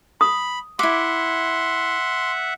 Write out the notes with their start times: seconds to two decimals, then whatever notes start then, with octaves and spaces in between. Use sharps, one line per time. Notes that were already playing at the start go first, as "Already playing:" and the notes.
0.21 B5 D#6
0.79 E4 E5 F#5 C6 D6